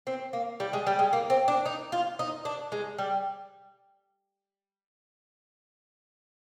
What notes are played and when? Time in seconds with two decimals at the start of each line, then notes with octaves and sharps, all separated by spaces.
0.07 C4
0.33 A#3
0.60 G3
0.73 G#3
0.87 G3
0.99 G#3
1.13 A#3
1.30 C4
1.48 D4
1.66 D#4
1.92 F4
2.19 D#4
2.45 D4
2.72 G#3
2.98 G3